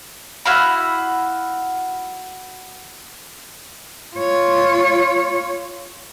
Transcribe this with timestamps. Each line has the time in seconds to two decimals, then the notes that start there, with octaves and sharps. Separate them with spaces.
0.45 E4 F#4 F5 B5
4.16 F4 C#5